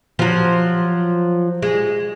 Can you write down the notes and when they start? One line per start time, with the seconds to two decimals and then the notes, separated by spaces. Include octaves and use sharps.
0.19 F3 F#3
1.62 G#3